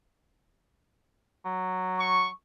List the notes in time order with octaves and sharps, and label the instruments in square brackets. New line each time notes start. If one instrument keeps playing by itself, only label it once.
[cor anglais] F#3
[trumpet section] C#6